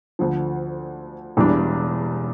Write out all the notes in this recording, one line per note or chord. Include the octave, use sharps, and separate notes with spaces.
D2 D3 F3
E1 E2 E3 G3 D4